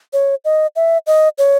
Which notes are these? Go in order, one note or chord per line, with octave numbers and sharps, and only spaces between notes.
C#5
D#5
E5
D#5
C#5